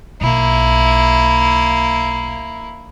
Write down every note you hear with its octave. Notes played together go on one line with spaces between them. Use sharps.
B1 A#3 E4